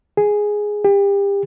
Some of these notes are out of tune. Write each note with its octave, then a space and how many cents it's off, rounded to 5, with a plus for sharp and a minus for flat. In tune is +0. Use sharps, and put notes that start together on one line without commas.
G#4 +0
G4 +30